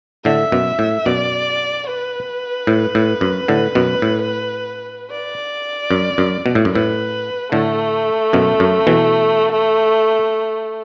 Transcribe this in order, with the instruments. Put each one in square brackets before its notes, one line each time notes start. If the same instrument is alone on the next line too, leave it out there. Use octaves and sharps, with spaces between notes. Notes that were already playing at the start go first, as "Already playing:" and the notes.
[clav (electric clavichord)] A2 D3 [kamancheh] E5
[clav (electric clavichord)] F#2 B2
A2
[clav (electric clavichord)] F#2 B2 [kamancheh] D5
[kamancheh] B4
[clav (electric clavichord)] A2
A2
F#2
A2 D3
F#2 B2
A2
[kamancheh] D5
[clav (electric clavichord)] F#2
F#2
B2
A2
F#2
[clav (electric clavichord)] A2 [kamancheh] B4
[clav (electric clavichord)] A2 D3 [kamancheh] A3
[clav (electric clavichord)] F#2 B2
F#2
B2 E3